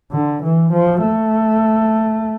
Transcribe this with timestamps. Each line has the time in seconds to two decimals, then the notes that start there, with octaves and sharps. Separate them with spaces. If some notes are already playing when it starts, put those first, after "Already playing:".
0.12 D3
0.43 E3
0.73 F3
1.02 A3